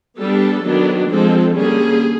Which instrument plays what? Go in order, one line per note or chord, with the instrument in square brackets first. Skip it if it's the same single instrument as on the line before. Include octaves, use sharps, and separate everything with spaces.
[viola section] G3 B3 D4 A4
D#3 F#3 B3 D4
F3 G#3 C4 A4
D3 G3 A#3 C#4 G#4